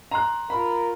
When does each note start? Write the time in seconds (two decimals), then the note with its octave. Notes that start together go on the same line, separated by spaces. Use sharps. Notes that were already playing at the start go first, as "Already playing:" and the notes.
0.11 A#5 C6 F#6
0.50 F4 A#4 B5